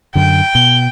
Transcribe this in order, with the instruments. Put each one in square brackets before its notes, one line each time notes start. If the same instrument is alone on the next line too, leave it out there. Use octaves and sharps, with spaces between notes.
[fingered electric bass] F#2 D3 [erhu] G5
[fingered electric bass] B2 [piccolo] G7